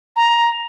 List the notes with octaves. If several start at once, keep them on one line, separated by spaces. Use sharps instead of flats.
A#5